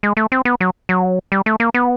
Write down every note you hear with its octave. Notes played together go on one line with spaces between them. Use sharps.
G#3
A3
C4
B3
F#3
F#3
G3
A3
A#3
B3